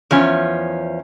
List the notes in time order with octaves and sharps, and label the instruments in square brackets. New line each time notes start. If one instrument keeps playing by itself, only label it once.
[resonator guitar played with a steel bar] E2 F3 C#4